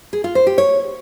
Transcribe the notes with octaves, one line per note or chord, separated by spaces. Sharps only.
G#4
F4
C5
G4
C#5